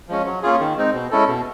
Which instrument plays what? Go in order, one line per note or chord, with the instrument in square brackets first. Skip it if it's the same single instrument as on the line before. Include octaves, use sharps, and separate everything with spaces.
[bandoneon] F3 G#3 C#4
F#3
A#3 C#4 F4 G#4
D#3
G#3 C4 D#4
B2
G#3 C#4 E4 A4
B2